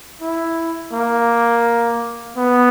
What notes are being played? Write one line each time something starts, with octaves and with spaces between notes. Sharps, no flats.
E4
A#3
B3